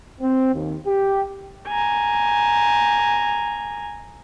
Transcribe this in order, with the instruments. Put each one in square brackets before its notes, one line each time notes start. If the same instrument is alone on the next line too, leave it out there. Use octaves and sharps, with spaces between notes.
[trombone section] C4
D#2
G4
[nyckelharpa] G#5 A#5